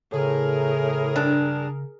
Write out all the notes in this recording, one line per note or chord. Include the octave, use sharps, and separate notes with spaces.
A2 C#3 G#4 A#4
G2 D4